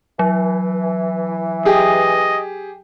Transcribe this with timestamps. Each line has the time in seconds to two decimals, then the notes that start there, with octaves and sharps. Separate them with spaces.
0.19 E3 F#3
1.65 G4 G#4 D#5